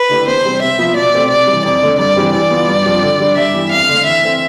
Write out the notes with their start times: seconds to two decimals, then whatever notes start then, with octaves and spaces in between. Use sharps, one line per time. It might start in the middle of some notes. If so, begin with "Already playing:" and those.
Already playing: B4
0.09 D3 A3 E4 G4
0.27 E2 C5
0.44 C3 G3 C4
0.61 C3 E5
0.78 F3 B3 F4
0.95 B2 D5
1.13 A3 C4 G4
1.30 C3 D5
1.47 E3 G3
1.64 F2 D5
1.82 D3 A3 D4
1.98 G2 D5
2.16 E3 G3 C4
2.33 E3 D5
2.51 B3 F4
2.68 G2
2.85 F3 C4 G4
3.02 D3
3.20 G3 D4
3.36 G2 E5
3.53 E3 B3 E4 G4
3.71 F2 F5
3.89 D3 A3
4.06 E3 E5
4.23 A3 C4